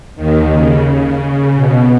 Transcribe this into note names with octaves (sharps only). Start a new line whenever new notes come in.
D#2 D#3
C#3
B2